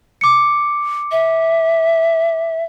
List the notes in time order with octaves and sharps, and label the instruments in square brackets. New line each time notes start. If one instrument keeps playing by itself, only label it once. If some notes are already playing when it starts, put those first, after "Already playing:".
[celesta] D6 C#7
[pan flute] E5